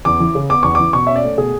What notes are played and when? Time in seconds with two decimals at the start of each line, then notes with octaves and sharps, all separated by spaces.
0.05 E2 D6
0.20 E3
0.35 C#3
0.49 B3 D6
0.63 E2 C#6
0.75 E3 D6
0.93 B2 C#6
1.07 C#4 E5
1.16 D5
1.23 A3
1.38 B2 G#4